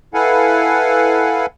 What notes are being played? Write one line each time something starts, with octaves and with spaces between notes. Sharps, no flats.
E4 A4 B4 F5 F#5 G#5